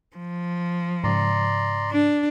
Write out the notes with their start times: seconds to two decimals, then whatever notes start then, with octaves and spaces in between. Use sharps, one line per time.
0.16 F3
1.04 G#2 C#3 D5 A#5 C6
1.91 D4